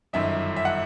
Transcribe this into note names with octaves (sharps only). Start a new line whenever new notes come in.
G1 F#2 D#3 E5
E5
F#5